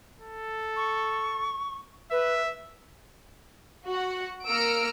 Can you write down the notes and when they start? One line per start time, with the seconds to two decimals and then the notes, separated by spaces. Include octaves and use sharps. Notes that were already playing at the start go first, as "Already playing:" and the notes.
0.20 A4
0.76 C#6
2.11 B4 E5
3.87 F#4 F#5
4.48 A#3 E6 F6 A#6 C#7 D7